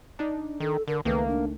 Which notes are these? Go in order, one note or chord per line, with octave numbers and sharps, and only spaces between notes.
D4 D#4
D#3 A4
D3 A#4
C#2 D#3 A3 A#3 B4
D4